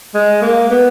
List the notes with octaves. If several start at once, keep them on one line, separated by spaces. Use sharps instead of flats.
G#3
A#3
B3